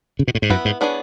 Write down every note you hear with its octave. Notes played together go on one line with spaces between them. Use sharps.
C#3
B2
A2
G#2
F#2 B3 E4 B4
G#2
E3 B3 D4 G#4 C#5